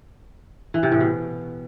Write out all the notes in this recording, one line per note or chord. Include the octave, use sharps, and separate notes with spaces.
E3
C3
A2
B2